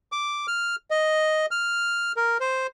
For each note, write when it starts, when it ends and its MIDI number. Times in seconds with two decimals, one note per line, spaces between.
0.12 0.47 86
0.47 0.76 89
0.91 1.46 75
1.51 2.12 89
2.17 2.38 70
2.40 2.67 72